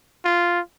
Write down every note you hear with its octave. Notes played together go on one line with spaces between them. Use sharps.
F4